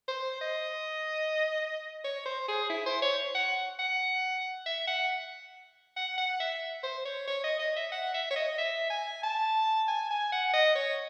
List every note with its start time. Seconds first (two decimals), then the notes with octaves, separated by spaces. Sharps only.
0.08 C5
0.41 D#5
2.04 C#5
2.26 C5
2.48 G#4
2.70 E4
2.86 C5
3.02 C#5
3.35 F#5
3.79 F#5
4.66 E5
4.87 F#5
5.96 F#5
6.18 F#5
6.40 E5
6.83 C5
7.05 C#5
7.27 C#5
7.44 D#5
7.59 D#5
7.76 E5
7.92 F#5
8.14 E5
8.30 C#5
8.36 D#5
8.58 E5
8.90 G#5
9.23 A5
9.88 G#5
10.10 G#5
10.32 F#5
10.54 D#5
10.75 C#5